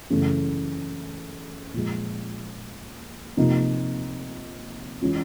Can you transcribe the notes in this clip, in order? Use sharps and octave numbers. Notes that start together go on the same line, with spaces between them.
F#2 C#3 E3 A3
A#2 F3 G#3
C3 F3 A#3 D#4
E3 G#3 C#4 F4